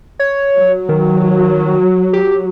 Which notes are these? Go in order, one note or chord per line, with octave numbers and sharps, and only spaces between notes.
C#5
F#3
D#3
G4